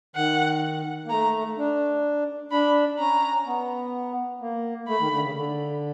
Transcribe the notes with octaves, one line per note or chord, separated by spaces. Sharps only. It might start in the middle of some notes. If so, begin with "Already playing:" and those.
D#3 F#5
A#3
A3 A#5
D4
D4 B5
C#4 A#5
B3
A#3
A3 B5
D#3
D3
C#3
D3